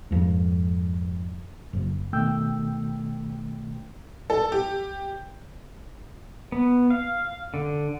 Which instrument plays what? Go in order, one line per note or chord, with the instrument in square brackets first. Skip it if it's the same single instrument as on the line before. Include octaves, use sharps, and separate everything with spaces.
[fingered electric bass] F2 G#2
F#1
[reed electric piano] B2 D#3 A3 G5 E6 G6
[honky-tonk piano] A4
G4
[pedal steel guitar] B3
F5
D3